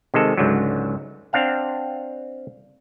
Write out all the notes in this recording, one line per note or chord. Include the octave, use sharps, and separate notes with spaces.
C3 D#3 G#3 A4
C#2 G#2 D3 F#3
C4 D4 F5 F#5